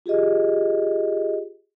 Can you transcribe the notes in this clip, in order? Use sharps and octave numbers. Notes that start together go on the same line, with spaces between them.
F4 G4 G#4 D#5